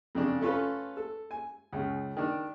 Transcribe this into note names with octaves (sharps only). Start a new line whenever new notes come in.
F2 C#3 D4
A3 C#4 F4 A4 B4
A4
G#5
C#2 C#3
D#3 D4